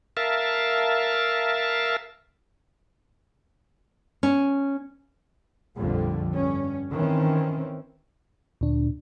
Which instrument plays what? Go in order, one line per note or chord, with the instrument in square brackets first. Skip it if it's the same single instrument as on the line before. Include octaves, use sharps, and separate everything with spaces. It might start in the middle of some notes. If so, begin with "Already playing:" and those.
[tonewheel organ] A#4 E5 F5 A5
[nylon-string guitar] C#4
[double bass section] A#1 F2 D3 G3
G2 C#4
D#3 E3 C4 C#4
[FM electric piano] D2 D4 [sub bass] A#2